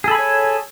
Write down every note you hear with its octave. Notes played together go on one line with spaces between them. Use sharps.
G#4 A4 C#5 G#5 B5